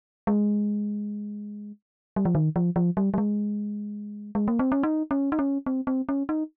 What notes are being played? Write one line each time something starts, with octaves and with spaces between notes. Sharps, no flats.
G#3
G3
F3
D#3
F3
F3
G3
G3
G#3
G#3
A#3
C4
C#4
D#4
C#4
D#4
C#4
C4
C4
C#4
D#4